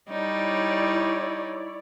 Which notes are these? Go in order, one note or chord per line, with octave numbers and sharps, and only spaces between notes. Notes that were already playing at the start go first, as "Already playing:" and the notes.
G3 D#4 E4 C#5 D5